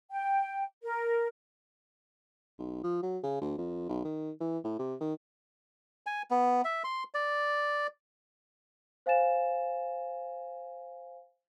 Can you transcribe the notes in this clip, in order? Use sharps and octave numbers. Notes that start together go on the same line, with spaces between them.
G5
A#4
B1
F3
F#3
C#3
D2
F2
B1
D#3
E3
A2
C3
D#3
G#5
B3
E5
C6
D5
C5 F5 G#5 A6 E7